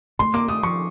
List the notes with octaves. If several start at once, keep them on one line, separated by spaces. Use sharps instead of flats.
A3 C6
A#3 D6
A3 D#6
F3 C#6